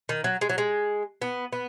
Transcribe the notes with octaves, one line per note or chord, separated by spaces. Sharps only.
D#3
F#3
G#3
F#3
G#3
B3
B3